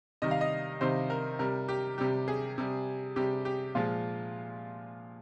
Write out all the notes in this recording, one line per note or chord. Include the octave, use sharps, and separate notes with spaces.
C3 D#3 G3 D#5
F5
D#5
C3 D#3 G3 C5
A#4
C3 G3 A#4
G4
C3 G3 G4
G#4
C3 G3
C3 G3 G4
G4
A#2 F3 G#3 F4